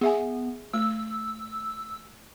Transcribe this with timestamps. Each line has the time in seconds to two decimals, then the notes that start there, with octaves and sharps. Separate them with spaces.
0.01 B3 G#4 E5 G#5
0.73 A3 E6